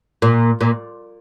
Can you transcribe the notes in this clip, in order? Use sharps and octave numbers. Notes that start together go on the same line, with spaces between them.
A#2
A#2